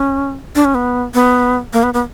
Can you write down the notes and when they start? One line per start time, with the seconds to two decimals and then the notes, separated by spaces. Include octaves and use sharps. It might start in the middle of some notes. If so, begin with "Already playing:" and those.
Already playing: C#4
0.55 D4
0.65 C#4
0.75 B3
1.14 B3
1.73 A#3
1.83 B3
1.94 B3